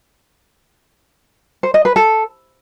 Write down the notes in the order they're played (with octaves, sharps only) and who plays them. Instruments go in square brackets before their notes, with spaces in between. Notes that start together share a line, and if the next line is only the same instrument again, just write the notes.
[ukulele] C5
D#5
B4
A4